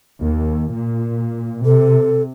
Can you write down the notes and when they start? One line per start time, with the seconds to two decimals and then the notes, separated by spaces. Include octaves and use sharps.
0.20 D#2
0.72 A#2
1.65 C3 A4